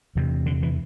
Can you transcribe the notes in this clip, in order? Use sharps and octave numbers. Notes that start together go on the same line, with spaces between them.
E2 C3
D3
E3